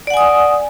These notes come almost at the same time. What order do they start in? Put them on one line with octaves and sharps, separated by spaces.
D5 F#5 G#5 D#6